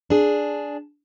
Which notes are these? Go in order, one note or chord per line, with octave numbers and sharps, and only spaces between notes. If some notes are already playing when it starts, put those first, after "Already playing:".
D4 G#4